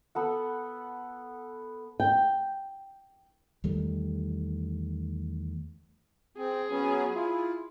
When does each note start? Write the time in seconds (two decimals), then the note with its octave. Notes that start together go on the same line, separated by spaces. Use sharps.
0.15 B3 A4 F#5
2.00 G5
3.64 E2 D#3 G3 A3
6.37 C4 G#4
6.70 F#3 B3 C#4
7.15 E4 F4